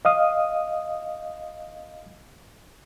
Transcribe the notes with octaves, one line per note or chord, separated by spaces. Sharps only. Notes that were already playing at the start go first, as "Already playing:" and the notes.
D#5 F5 D#6